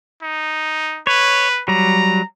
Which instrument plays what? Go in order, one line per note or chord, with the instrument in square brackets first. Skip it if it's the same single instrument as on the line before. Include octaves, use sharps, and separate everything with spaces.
[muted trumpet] D#4
[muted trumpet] B4 [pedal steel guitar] C#5
[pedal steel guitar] F#3 G3 [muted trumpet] A#5